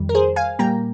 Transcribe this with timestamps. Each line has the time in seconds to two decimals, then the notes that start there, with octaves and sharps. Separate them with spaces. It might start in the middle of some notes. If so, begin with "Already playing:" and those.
Already playing: F2 D#3 G3
0.09 A#4
0.15 G#4 C5
0.36 F5 G#5
0.59 A#2 G3 A#3 G5 A#5